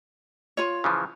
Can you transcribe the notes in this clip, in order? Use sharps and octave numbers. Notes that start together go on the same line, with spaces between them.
F4 C#5
C#3 E3 F3